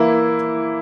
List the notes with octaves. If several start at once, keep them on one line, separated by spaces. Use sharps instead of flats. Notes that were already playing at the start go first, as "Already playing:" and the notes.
Already playing: E3 A#3 E4